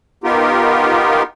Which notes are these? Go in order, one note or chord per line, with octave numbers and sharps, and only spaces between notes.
B3 D#4 F4 G4 A#4